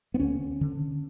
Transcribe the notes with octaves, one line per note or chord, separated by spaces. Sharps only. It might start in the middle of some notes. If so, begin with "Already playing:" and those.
B3
D2 C#4
D3